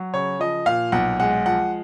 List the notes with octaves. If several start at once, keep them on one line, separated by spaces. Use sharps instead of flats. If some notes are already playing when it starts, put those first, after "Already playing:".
Already playing: F#3
C#3 C#5
F3 D#5
A#2 F5
B1 F#5
G#3 F#5
F3 F#5